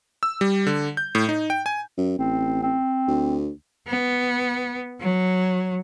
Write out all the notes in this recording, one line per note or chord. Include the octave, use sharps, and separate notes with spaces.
E6
G3
D3
G6
A2
D#4
G5
G#5
F#2
A1 C4
C4
D2
B3
F#3